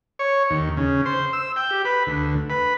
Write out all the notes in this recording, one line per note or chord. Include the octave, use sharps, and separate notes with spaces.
C#5
D#2
C#3
C5
E6
G5
G4
B4
D2
B4